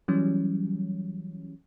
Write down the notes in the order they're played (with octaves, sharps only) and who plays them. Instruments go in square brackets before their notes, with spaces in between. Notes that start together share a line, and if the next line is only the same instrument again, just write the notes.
[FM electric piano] E3 F#3 G3 C#4